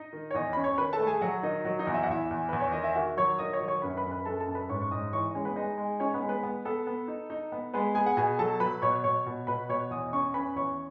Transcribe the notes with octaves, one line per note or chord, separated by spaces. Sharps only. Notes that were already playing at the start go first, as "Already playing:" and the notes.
Already playing: D#4 D#5
D#3
C#5
E2 D#4 D#5
C#4 B5
C#5 C#6
D#3 B4 B5
A4 A5
A3
G#4 G#5
F#3 F#4 F#5
D#3 D#4 D#5
F#3
D#4 D#5
E2
E5
F#5
E2 E4 E5
E2
E2 B4
C#5
D#3 D#5
E5
D#3 F#4 F#5
F#3 C#5 C#6
D#3 D#5 D#6
C#5 C#6
F#3
C#5 C#6
F#2 B4 B5
B4 B5
F#2
B4 B5
F#2 A4 A5
A4 A5
F#2
B4 B5
G#2 C#5 C#6
C#6
G#2 D#5 D#6
E3 C#5 C#6
D#5
G#3 C#4 C#5
B3 B4
G#3 D#4 D#5
G#3
C#4 D#4 C#5
B3 B4
G#3
B3 B4
B3
B3 A4
B3
D#4
D#4
B3
G#3 B3 B4
B3 G#4 G#5
F#5
B2 G#4 G#5
F#3 A4 A5
F#3 B4 B5
B2 C#5 C#6
B2 C#5 C#6
B2
B2 B4 B5
B2 C#5 C#6
E2 D#5 D#6
C#4 C#5 C#6
C#4 B4 B5
E2 C#5 C#6